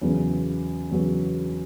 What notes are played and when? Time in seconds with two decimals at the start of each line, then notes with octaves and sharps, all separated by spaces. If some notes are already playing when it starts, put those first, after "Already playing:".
0.02 E2 C#3 F#3 B3
0.91 E2 C#3 F#3 B3